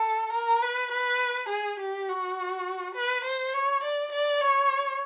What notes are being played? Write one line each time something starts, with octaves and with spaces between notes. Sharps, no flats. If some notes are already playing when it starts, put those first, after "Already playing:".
Already playing: A4
A#4
B4
B4
G#4
G4
F#4
B4
C5
C#5
D5
D5
C#5